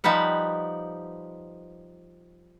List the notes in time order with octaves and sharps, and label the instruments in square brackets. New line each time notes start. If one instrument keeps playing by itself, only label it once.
[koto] F3 G3 D#4 B4 F#5